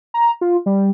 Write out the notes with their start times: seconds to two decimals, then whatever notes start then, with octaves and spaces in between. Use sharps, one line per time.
0.14 A#5
0.41 F4
0.66 G3